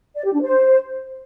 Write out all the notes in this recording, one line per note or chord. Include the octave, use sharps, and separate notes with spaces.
D5
G4
D4
C5